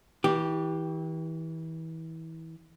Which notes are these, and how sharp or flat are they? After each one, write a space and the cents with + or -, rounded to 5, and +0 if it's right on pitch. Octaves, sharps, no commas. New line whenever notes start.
E3 -30 G4 +0